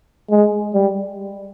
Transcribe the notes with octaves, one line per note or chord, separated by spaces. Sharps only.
G#3
G3